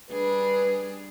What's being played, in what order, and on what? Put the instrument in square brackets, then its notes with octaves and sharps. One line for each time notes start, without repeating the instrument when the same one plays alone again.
[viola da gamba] G3 D4 G#4 [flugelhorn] B4